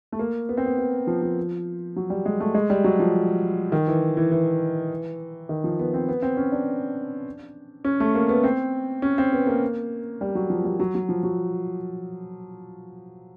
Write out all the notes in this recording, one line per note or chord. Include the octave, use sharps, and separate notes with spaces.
A3
A#3
B3
C4
B3
B3
F3
F3
F#3
G3
G#3
A3
G#3
G3
F#3
F3
D#3
E3
E3
E3
D#3
F3
B3
C4
B3
C4
C#4
D4
C#4
A3
A#3
B3
C4
C#4
C4
B3
A#3
G3
F#3
F3
G3
F#3
F#3
F3
F#3